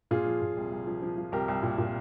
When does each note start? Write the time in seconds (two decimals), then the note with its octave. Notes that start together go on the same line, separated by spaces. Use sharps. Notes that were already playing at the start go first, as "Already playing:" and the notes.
0.11 A#2 F4 G#4
0.26 F3
0.42 A#2
0.57 C2
0.72 C2
0.87 F3
1.02 F3
1.18 F3
1.32 C2 G4 A#4
1.48 C2
1.63 A#2
1.78 A#2